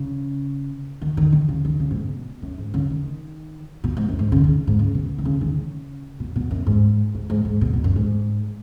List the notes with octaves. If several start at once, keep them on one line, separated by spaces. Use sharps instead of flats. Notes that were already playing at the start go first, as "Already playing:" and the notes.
Already playing: C#3
D#3
D#3
D#3
C#3
D#3
C#3
G#2
B2
F#2
G#2
C#3
D#3
B2
G#2
F#2
G#2
C#3
D#3
G#2
C#3
B2
D#3
C#3
D#3
C#3
B2
B2
F#2
G#2
G#2
G#2
G#2
B2
B2
F#2
G#2